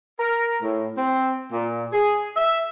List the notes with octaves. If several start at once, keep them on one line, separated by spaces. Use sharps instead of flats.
A#4
A2
C4
A#2
G#4
E5